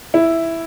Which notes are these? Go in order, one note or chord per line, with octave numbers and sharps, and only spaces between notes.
E4